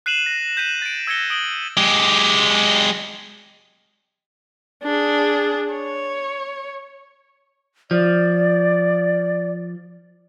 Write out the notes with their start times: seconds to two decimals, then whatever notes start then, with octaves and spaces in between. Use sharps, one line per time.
0.06 F#6 C7 D#7 E7 F#7
0.26 A#6
0.57 G6 B6 D#7 E7
0.82 A6 D7
1.07 E6 G#6 A#6 C#7 G7
1.30 D#6 D7 F#7 G7
1.77 G#3 G4
4.83 D4 G#4
5.73 C#5
7.91 F3 D5